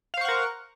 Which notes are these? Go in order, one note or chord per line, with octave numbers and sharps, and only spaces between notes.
A#4 C5 F5 F#5 C#6